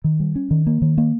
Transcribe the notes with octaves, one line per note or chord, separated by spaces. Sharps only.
D#3
G3
C#4
D#3
A#3
D#3
A#3